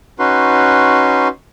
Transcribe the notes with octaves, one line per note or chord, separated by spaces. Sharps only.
C#4 D#4 F#4 B4 C6